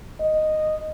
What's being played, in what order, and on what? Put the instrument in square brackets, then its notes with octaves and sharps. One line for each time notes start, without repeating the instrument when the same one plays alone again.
[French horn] D#5